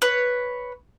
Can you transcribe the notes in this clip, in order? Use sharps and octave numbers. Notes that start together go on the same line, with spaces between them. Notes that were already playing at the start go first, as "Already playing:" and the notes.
B4 C#5